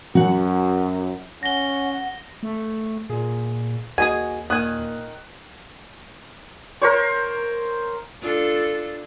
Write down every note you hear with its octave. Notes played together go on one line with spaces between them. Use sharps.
F#2 F#3 F#4 F#5
C#4 F#5 A#6 G7
A3
A#2 G#4
D#2 F#4 G#4 D#5 G#5
A#2 D#3 G#5 D#6 F#6
A#4 C5 C#5
D4 F4 A4